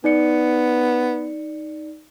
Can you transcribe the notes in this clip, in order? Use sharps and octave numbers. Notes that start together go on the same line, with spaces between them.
B3 D#4 D5 C#7